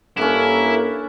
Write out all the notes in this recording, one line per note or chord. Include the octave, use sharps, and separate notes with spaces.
G2 A#3 C#4 D4 E4 A4 A#4